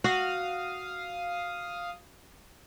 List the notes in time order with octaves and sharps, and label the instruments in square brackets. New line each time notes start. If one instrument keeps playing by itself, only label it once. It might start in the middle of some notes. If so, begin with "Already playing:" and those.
[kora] F#4 [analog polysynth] F5 D#6